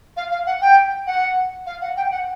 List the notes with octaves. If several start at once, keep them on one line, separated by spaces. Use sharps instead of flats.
F5
F5
F#5
G5
F#5
F5
F#5
G5
F#5